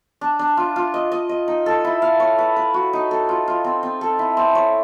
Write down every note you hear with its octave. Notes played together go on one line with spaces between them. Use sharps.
D4
D4
F4
F4
D#5
D#5
D#5
D#4
A4
E4
F5
C#5
B4
B4
F#4
D#4
A4
F4
F4
C4
C4
A4
E4
C4
C#5